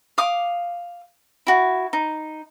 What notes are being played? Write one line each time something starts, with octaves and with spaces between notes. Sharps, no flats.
F5 D6 D#6
E4 F#4
D#4